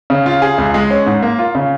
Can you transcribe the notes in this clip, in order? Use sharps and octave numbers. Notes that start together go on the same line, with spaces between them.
C#3
F4
G#4
C#2
G#3
C#4
G#2
A#3
F4
C#3